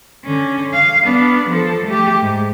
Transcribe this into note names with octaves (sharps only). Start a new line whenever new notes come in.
D3 C#4
F5
B3 D4
F3 A4
A3 G4
G#2